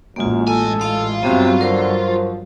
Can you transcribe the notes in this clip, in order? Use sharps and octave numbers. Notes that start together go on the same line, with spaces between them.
A1 F#2 G#3 A#3 F4
F#2 A4 G#5
F4 F5
G2 C3 F#3 B3 C4 F#4
D3 A#4 C5
F3